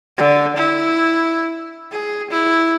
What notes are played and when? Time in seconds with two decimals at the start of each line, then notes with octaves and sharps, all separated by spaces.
0.18 D3
0.56 E4
1.92 G#4
2.31 E4